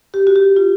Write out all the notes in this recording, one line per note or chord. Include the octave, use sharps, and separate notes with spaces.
G4
F#4
G4
F4